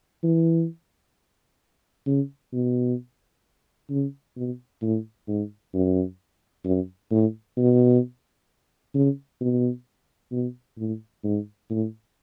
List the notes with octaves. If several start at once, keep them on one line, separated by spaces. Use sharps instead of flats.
E3
C#3
B2
C#3
B2
A2
G#2
F#2
F#2
A2
B2
C#3
B2
B2
A2
G#2
A2